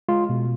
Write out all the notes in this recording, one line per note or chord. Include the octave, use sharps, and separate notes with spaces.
G#3 F4
B2